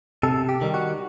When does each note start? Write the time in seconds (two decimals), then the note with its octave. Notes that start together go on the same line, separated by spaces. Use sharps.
0.23 C3 A4
0.49 G4
0.61 D#3 G3
0.74 F#4